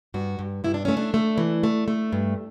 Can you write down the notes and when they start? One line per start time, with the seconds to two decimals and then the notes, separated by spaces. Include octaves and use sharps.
0.14 G2 F#4
0.39 G2
0.64 G2 E4
0.74 D4
0.85 A3 C#4
0.97 D4
1.14 A3
1.38 E3
1.63 A3
1.88 A3
2.12 G2